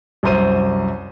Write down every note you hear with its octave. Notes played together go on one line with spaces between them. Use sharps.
C2 F#2 C5 D#7